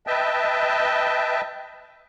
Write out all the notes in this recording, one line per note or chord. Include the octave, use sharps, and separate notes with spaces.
B4 D#5 E5 G5 A5